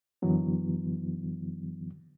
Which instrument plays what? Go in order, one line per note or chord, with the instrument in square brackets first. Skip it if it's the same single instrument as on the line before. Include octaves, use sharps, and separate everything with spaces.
[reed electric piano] F#2 D3 E3 F#3 B3